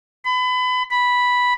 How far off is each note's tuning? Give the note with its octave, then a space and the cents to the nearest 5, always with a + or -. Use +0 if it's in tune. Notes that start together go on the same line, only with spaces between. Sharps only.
B5 +30
B5 -5